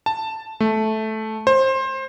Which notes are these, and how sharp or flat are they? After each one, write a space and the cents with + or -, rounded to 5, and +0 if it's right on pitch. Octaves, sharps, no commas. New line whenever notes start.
A5 +5
A3 -10
C5 +20